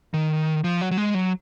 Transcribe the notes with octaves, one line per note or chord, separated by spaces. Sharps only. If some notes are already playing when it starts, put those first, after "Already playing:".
D#3
F3
F#3
F#3
G#3
F#3